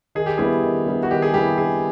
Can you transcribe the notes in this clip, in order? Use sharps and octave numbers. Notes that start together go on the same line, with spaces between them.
D#3 G#4
G4
G3 B3 E4 G#4
D#3
G3 B3 E4
F#4
D#3 G4
G#4
G3 B3 E4 G4
D#3 G#4